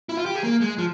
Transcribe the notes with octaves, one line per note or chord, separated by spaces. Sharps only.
E4
F4
G4
G#4
A#3
G#3
F3